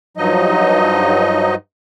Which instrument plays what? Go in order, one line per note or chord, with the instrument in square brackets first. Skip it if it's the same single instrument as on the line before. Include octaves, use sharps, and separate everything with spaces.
[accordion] G2 F3 F#3 D#4 D#5